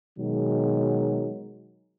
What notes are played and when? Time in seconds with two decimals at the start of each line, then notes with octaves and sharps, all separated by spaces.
0.18 B2 D#3 F#3 G#3